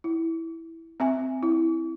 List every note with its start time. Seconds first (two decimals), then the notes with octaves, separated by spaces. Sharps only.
0.04 E4
1.00 C4 E5 G#5
1.43 E4